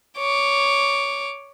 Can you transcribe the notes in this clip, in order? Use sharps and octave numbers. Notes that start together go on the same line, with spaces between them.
C#5 D6